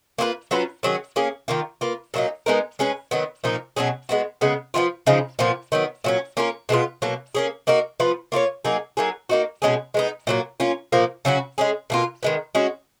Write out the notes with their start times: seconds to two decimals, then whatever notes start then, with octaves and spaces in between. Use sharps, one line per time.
0.18 A#3 F4 G#4 B4
0.51 F#3 C#4 F4 B4
0.83 D#3 F#3 C#4 G#4
1.16 A#3 C#4 G#4
1.48 D#3 A#3 F4
1.81 A#3 F4 B4
2.14 A#2 F#3 A#3 D#4
2.46 G#3 B3 D#4 A#4
2.79 G#3 C#4 G#4 B4
3.11 D#3 F#3 B3
3.44 A#2 F3 A#3 D#4
3.76 B2 F#3 C#4 G#4
4.09 G#3 B3 F#4
4.41 C#3 G#3 B3
4.74 F3 G#3 B3 F4
5.07 C#3 F3 G#3 D#4
5.39 A#2 F3 B3 F4
5.72 D#3 F#3 B3
6.04 A#2 F#3 C#4
6.37 A#3 C#4 F4 A#4
6.69 B2 G#3 B3 F4
7.02 B2 F#3 A#3
7.35 A#3 C#4 G#4
7.67 A#3 D#4 F#4 A#4
8.00 F3 B3 F4 B4
8.32 A#3 F4 G#4 C#5
8.65 F#3 A#3 D#4 G#4
8.97 F#3 A#3 D#4 G#4
9.29 A#3 D#4 F#4
9.62 B2 G#3 C#4 G#4
9.94 G#3 B3 D#4
10.27 A#2 F#3 A#3
10.60 A#3 C#4 F4
10.92 A#2 F3 A#3
11.25 C#3 F#3 C#4 F#4
11.58 G#3 C#4 G#4
11.90 B2 A#3 F4
12.23 D#3 G#3 B3
12.55 G#3 C#4 F#4